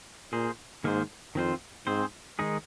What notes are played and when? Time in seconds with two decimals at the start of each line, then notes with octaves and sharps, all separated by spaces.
0.32 A#2 A#3 G#4 C5
0.84 G#2 D#3 A#3 G#4 C5
1.35 F2 D#3 C4 F4 C5
1.86 G#2 C4 G#4 C5
2.39 D#3 G#3 D#4 G#4